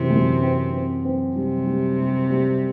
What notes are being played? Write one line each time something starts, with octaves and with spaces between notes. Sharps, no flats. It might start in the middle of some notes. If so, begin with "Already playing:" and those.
Already playing: F#2 C3 E3
F#2
C4
C4
C4
C3 G3
G3
G3
G3